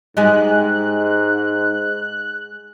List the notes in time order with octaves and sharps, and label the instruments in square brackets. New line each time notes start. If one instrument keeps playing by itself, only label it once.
[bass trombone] G#2 [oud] G#3 G4 G#4 [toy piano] D#4 D#5 [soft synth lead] F#6